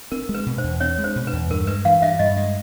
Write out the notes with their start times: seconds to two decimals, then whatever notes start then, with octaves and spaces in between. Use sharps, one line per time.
0.12 C4 A#4
0.29 G#3
0.34 B4
0.46 B2
0.58 C5
0.64 E2
0.80 C4 C#5
0.98 G#3
1.04 C5
1.16 B2
1.27 B4
1.33 E2
1.50 G2 A#4
1.67 G#3 B4
1.85 E3 F5
2.02 G2 E5
2.19 G2 D#5
2.37 G#3